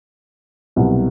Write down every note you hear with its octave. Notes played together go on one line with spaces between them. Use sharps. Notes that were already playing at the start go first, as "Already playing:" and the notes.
C2 B2 F#3